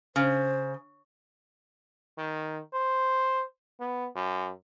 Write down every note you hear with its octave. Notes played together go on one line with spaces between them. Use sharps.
C#3 C5
D#3
C5
B3
F#2